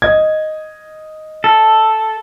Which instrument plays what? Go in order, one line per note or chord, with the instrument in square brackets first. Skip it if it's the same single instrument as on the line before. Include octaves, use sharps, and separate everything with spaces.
[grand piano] D#5 G#6
[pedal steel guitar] A4